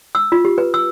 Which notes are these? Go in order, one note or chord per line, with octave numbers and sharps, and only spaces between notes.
E6
F4
G4
B4
E6